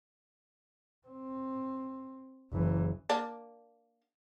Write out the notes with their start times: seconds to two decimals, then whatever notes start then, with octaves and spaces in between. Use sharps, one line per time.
1.07 C4
2.53 F#1 E3
3.10 A#3 D4